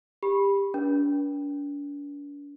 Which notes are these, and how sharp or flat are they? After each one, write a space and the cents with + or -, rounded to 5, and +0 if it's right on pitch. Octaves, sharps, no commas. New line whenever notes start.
G4 +20 B5 -15
D4 -40 B4 -40